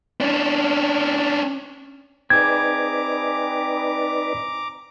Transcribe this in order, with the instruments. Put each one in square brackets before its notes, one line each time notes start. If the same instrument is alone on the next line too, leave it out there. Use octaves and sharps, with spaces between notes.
[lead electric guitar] C#4 D4
[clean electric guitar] C4 G#4 [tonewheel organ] D#4 B4 D5 [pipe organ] A#5 D6 [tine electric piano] G#6